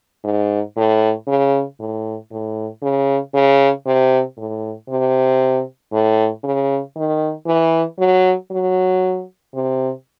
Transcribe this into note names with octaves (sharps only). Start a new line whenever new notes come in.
G#2
A2
C#3
A2
A2
C#3
C#3
C3
A2
C3
A2
C#3
D#3
E3
F#3
F#3
C3